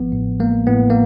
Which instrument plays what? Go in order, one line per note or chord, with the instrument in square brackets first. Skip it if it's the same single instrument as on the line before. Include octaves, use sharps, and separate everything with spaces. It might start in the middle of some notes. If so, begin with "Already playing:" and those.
Already playing: [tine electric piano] A1 F3 B3
A2
G#3 A#3
A2 B3
A#3